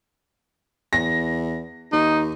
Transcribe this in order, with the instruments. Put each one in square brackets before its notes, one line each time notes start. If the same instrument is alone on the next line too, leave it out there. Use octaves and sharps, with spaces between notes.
[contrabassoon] E2 [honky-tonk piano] A#6
[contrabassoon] D#2 [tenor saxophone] D#4